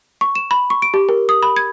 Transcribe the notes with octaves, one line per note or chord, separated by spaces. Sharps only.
C#6
E7
B5
C#6
D7
G4
A#4
D#6
B5
G#6